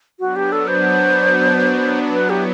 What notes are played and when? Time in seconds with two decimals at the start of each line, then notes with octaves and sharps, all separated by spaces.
0.20 F#3 B3 D4 F#4
0.36 G4
0.52 A4
0.68 C5
2.14 F#3 B3 E4 B4
2.30 G4